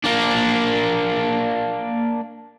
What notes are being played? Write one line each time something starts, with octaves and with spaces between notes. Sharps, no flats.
A#3 D4